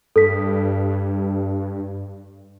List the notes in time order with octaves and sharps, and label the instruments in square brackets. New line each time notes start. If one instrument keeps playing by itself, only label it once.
[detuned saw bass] G2 [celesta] A4 B6